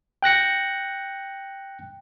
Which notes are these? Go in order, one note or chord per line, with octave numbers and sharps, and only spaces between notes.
G5 F#6 A#6 C#7